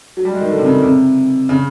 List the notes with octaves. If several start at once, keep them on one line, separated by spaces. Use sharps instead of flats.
F#3
G3
G#3
D#3
D3
C3
C#3
C3
C#3